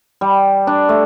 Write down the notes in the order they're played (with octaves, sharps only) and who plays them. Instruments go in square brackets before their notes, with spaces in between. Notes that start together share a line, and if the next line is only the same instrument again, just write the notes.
[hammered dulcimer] G3
D4
A3